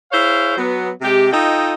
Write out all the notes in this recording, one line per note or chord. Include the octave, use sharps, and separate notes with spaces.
E4 G#4 C5 C#5 F5
F#3 B3
C3 G#3 G4
D#4 F4 A4 D#5 G5